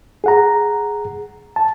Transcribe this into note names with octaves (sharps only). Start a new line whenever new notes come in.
G#4 F#5 A#5
A5